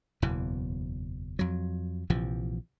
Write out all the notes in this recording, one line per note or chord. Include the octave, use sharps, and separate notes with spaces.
F#1 E2 B2 E3
F2 F#3
A#1 C3 E3 F3